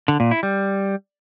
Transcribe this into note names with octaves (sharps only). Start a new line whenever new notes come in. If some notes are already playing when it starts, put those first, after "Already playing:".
D3
A#2
E4
G3